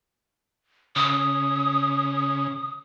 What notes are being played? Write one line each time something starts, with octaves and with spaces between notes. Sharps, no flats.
C#3 D#6